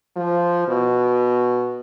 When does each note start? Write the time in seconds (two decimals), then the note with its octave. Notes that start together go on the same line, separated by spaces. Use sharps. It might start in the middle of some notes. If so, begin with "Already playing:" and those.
0.17 F3
0.68 B2